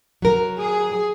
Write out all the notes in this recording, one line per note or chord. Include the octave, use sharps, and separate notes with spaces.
F#3 A#4
G#4